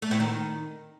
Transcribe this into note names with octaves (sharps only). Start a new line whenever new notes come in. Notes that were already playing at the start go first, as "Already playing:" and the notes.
A3
A2
D#3